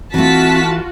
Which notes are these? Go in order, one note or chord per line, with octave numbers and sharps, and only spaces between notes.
E3 A3 C4 F4 F#4 A5 B6